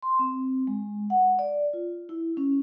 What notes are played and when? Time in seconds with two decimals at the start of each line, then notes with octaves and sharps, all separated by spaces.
0.03 C6
0.19 C4
0.67 G#3
1.10 F#5
1.39 D5
1.73 F4
2.09 E4
2.37 C#4